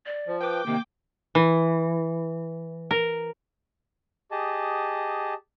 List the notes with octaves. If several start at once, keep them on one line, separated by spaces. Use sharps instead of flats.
D5
F3
B4 G5 D6
C3 D#3 A#3
E3
A#4
G4 G#4 D#5 A5